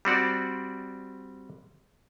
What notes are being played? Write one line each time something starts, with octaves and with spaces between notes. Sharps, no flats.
G3 C4 F#4 D5